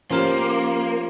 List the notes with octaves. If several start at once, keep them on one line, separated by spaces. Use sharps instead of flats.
F3 A#3 C#4 G4 A#4